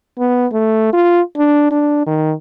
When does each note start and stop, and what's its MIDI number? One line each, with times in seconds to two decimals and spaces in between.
0.19 0.47 59
0.52 0.91 57
0.93 1.21 65
1.37 1.71 62
1.71 2.05 62
2.07 2.33 51